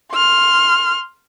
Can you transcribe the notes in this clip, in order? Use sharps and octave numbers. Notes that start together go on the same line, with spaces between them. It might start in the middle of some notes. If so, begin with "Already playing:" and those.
C6 F6